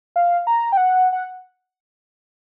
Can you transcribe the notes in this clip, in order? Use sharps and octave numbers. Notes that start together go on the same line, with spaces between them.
F5
A#5
G5
F#5
F#5